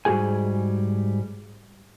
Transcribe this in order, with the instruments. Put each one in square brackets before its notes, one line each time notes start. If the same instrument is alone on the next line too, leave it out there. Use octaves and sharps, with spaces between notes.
[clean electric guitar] G#2 G3 F#4 G#4 G#5